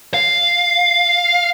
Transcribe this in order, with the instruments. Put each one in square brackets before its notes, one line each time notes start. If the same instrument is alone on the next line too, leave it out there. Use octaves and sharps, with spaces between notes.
[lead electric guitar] F5